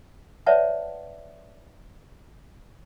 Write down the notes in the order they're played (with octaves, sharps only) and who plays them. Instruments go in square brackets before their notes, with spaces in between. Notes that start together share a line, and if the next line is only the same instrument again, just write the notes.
[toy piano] B4 C#5 D5 E5 F#5 A5